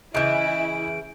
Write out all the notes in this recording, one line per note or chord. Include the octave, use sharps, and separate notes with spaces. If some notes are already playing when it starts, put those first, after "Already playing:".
C#3 E3 E4 D#5 G6 D7